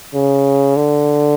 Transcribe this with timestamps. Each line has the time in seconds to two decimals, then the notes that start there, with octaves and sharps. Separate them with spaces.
0.14 C#3
0.76 D3